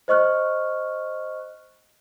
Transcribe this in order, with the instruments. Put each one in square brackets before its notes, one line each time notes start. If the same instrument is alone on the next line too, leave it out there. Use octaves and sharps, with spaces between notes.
[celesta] C5 D#5 C#6 F6 F#6